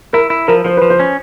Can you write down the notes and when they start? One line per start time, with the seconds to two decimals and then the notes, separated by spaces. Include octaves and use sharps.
0.13 E4 A#4
0.30 E4
0.48 F3 A#4
0.65 F3 C5
0.77 F3 B4
0.90 C5
1.00 C#4